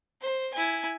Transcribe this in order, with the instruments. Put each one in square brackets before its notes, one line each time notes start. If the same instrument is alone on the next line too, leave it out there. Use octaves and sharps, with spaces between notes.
[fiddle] C5
E4 G#5